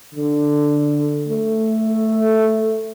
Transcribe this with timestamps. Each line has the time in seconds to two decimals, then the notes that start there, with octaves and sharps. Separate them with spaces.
0.15 D3
1.28 A3